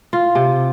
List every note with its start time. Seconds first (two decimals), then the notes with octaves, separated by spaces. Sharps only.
0.13 F4
0.35 C3